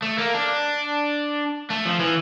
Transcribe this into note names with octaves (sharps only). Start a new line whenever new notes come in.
A3
A#3
D4
A3
F3
E3